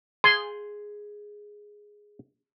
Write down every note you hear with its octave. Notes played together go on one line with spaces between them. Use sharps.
G#4 C6